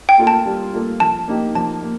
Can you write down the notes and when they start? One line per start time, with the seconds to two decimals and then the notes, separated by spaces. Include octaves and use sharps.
0.09 G5
0.18 A#3 F4 A4
0.27 A5
0.46 G3
0.73 A#3 F4 A4
1.00 F3 A5
1.28 A#3 D#4 G4
1.55 F3 A5
1.82 A#3